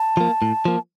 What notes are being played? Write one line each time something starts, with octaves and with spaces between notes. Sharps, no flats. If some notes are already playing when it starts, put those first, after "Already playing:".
Already playing: A5
F3 A#3
A2
F3 A#3